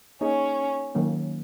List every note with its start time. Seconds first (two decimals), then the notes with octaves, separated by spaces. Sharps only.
0.21 A#3 C#4 D#4 G#4 C#5
0.95 D#3 F#3 A#3 C#4